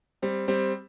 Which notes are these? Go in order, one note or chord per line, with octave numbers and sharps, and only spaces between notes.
G3 C4
G3 C4